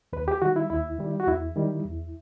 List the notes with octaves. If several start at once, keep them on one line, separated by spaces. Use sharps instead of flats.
D#2 B4
G4
D#3 G3 F#4
E4
D#2 E4
D#3 G3
F#4
E2 E4
D#3 G3
E2